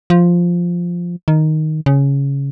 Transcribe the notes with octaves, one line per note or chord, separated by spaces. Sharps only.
F3
D#3
C#3